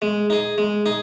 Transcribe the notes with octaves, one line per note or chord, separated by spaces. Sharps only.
G#3
D#4 G#4
G#3
D#4 G#4